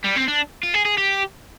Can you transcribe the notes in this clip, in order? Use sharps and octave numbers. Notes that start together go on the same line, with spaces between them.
G3
C4
D4
F4
G#4
G#4
G4